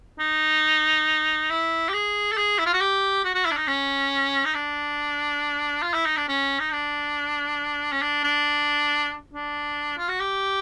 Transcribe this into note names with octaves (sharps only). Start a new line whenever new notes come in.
D#4
E4
G4
G#4
A4
G#4
E4
F4
F#4
G4
F#4
F#4
E4
D4
D#4
C#4
D#4
D4
F4
E4
D#4
D4
C#4
D#4
D4
C#4
D4
D4
D4
F4
F#4
G4